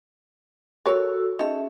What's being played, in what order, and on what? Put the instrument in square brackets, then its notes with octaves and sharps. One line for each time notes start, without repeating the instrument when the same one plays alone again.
[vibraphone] F#4 A4 E6 [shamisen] A#4 C#5
[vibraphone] C#4 G#4 E5 [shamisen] D#4 A4